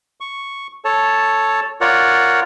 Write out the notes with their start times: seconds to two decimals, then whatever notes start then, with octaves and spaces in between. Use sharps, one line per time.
0.20 C#6
0.85 A4 C#5 A5
1.81 F4 A#4 C#5 D5 F#5